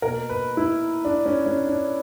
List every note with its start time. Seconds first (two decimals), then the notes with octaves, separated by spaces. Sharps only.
0.02 B2 A#3 A#4
0.30 B4
0.57 E4
1.05 D4
1.26 C#4
1.46 C#4
1.67 D4